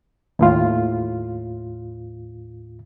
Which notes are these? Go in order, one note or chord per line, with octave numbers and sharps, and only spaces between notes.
D#2 A2 F4